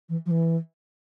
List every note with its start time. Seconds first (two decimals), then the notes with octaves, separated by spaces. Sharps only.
0.09 E3
0.26 F3
0.31 E3